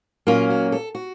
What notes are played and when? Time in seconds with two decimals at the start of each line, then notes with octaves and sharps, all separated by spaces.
0.27 A#2 F#3 A#3 C#4 F4
0.50 F#4
0.72 A4
0.95 F#4